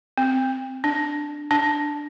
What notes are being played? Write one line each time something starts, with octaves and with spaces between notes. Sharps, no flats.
C4
D4
D4